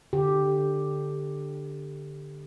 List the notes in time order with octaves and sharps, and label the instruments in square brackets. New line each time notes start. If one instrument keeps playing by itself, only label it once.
[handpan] D3 G4